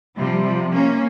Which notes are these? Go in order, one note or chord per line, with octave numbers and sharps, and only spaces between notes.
C3 F3 G3
F3
A#3 C#4